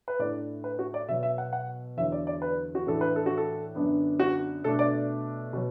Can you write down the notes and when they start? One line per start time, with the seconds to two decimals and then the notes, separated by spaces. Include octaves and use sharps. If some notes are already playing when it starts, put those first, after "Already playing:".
0.08 B4
0.19 A2 A3 D4 D5
0.64 B4
0.79 F#4
0.94 D5
1.08 B2 F#3 B3 E5
1.23 E5
1.38 F#5
1.53 F#5
1.97 E2 D3 F#3 B3 E5
2.12 D5
2.27 D5
2.42 B4
2.75 F#4
2.86 A2 E3 A3 D4 A4
3.01 B4
3.16 A4
3.26 F#4
3.37 A4
3.75 F#2 D3 B3 D4
4.19 F#4
4.64 B2 A3 D4 A4
4.79 D5
5.53 B2 F#3